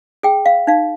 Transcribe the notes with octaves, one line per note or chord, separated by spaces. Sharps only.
G#4 G5
F5
D#4 F5